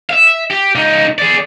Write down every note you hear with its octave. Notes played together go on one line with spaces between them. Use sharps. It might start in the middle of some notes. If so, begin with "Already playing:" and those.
E5 F5
G4
C#2 D#4
G#4 D5